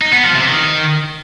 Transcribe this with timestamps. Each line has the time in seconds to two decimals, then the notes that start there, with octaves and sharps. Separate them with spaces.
0.01 D#4
0.13 B3
0.24 F3
0.35 C3
0.46 D#3